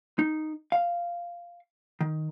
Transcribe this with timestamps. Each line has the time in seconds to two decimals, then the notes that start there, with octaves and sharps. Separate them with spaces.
0.19 D#4
0.72 F5
2.01 D#3